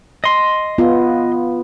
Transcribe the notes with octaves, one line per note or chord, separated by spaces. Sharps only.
D#5 C6
B3 F4